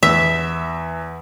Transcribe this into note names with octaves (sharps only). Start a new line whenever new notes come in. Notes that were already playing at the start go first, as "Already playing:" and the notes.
E2 E5